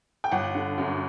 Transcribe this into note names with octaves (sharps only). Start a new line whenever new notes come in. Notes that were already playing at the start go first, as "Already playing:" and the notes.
G5
G1 F#5
D3
F#2